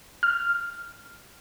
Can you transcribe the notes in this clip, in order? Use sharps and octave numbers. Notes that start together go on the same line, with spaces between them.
F6